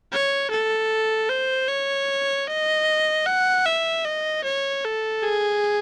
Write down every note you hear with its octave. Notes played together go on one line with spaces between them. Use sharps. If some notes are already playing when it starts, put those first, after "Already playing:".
C#5
A4
C5
C#5
D#5
F#5
E5
D#5
C#5
A4
G#4